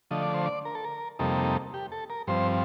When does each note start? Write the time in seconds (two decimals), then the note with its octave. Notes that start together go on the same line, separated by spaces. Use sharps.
0.11 D3 F3 A3 D#5
0.22 D5
0.34 C5
0.46 D5
0.65 A#4
0.75 A4
0.84 A#4
1.19 F2 C3 G3 A#3 D#4 A4
1.74 G4
1.92 A4
2.10 A#4
2.27 G2 F3 C4 C5